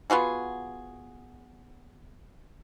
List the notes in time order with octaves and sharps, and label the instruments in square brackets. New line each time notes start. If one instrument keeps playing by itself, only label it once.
[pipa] B3 F4 F#4 G#4